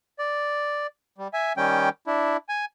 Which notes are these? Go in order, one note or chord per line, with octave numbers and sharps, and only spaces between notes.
D5
G3
E5 G#5
D#3 G3 C#4 G5
D4 E4
G#5